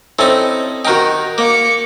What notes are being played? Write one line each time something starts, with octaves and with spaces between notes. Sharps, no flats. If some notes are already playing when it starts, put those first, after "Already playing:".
C4 C#4 D#4 E4 A4
D#3 D#4 F#4 A#4 G5
A#3 D6 C#7